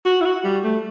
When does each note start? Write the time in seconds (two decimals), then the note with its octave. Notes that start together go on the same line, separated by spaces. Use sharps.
0.05 F#4
0.21 E4
0.25 F#4
0.44 G3
0.64 A3